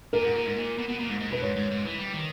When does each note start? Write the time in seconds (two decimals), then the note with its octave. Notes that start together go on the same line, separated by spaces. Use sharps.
0.13 A#2 A#4
0.23 G#2
0.35 A#2
0.45 G#2
0.56 A#2
0.78 B2
0.88 B2
0.99 A#2
1.10 G#2
1.20 G#2
1.31 B2 B4
1.41 G#2 C#5
1.56 G#2
1.71 G#2
1.85 E3
1.99 G3
2.13 D#3